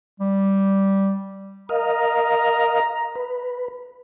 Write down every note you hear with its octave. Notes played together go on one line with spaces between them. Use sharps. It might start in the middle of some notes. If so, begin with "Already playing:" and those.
G3
A#4 D#5 F5 A#5
B4